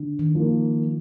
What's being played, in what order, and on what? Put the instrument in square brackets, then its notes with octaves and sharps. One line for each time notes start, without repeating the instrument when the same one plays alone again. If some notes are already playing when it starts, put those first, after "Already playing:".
Already playing: [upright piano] D3
[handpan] D#3
[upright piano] F3 A#3